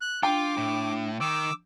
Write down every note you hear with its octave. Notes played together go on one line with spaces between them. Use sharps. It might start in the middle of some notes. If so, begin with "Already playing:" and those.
F#6
D4 F4 G5 D6
A2
D#3 D6 E6